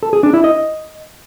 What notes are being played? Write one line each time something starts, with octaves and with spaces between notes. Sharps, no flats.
A4
G#4
D4
E4
D#5